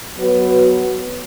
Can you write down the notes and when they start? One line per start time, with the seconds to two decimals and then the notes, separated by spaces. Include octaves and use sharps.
0.17 F#3 B3 F#4 B4